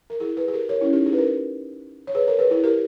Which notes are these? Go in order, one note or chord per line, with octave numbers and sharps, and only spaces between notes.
A#4
E4 G#4
G#4 B4
G#4
G4 A#4
A#4 C#5
C#4 E4
D#4 G4
E4 G#4
B4
G4 A#4
C#5
G#4 B4
A#4 C#5
G#4 B4
E4 G#4
G4 A#4